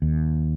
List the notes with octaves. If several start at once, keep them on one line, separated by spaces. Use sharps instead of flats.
D#2